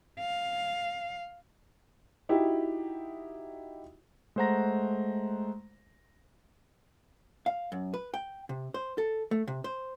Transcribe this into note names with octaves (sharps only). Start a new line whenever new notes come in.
F5
D#4 E4 F#4 G4
G#3 A3 C5 F#5 A#5 A#6
F5
F#2
B4
G5
C3
C5
A4
A3
C3
C5